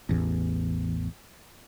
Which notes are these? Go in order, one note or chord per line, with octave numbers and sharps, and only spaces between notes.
A1 E2